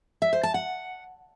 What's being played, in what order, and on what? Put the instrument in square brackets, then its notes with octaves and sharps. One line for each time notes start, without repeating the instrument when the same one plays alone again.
[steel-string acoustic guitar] E5
C5
A5
F#5